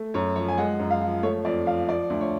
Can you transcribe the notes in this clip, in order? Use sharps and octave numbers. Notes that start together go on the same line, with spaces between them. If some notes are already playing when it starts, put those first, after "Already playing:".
Already playing: A3
F#2 C#5
F3 C#5
G#5
G#3 F#5
F#2
F5
F3
A3 C#5
F2 D5
F3 F5
F3 D5
D2
C#5